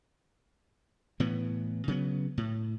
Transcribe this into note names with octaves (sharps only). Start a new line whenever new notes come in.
A2 E3 B3
C#3 F#3 B3
A2